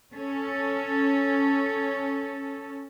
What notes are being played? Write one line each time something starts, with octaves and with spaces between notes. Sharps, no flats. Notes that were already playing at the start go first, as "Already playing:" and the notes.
C#4 A4